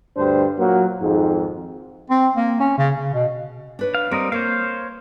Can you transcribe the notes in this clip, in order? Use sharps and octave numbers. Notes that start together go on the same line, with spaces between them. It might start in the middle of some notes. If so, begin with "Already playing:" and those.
D2 G2 D4 C5
A#2 F#3 A#3 F#4
G#1 F2 G#2
C4
A#3
C#4
C#3
C#3
B2
D4 B4 C#5
F5
G3 C4 A#4 D#5
A#3 C5 C#5 F5